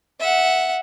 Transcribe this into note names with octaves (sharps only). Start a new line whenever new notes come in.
E5 F#5